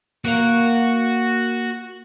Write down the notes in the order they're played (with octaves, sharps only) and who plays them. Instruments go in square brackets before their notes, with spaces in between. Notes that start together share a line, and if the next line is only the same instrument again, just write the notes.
[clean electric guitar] A#3 A#4 F5 [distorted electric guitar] F#4